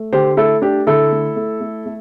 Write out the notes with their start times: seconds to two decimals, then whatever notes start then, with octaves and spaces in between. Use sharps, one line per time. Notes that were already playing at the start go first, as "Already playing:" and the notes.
Already playing: A3
0.12 D3 G4 C5
0.37 A3 E4 A4
0.62 A3 D4 G4
0.87 D3 E4 A4
1.12 A3
1.36 A3
1.61 A3
1.86 A3